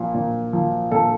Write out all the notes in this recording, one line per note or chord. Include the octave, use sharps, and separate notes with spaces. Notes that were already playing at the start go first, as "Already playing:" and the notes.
Already playing: A#2 F3
A#2
F3
A#2 A4